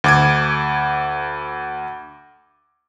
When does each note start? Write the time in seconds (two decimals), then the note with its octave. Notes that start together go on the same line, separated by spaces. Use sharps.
0.04 D2 D6 G#6